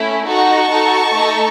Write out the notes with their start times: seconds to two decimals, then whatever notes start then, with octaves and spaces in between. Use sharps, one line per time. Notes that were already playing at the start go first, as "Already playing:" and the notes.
Already playing: A3 C#4 E4
0.28 D#4 F#4 A4 A5 C#6
0.71 D#4 F#4 A4
1.15 A3 D#4 A4